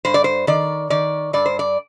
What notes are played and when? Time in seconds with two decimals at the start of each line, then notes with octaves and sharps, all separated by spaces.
0.05 G2 C5
0.14 D5
0.24 C5
0.47 D#3 D5
0.90 D#3 D5
1.33 G2 D5
1.46 C5
1.59 D5